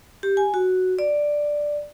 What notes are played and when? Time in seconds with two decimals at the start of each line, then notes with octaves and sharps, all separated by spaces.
0.23 G4
0.37 G#5
0.54 F#4
0.99 D5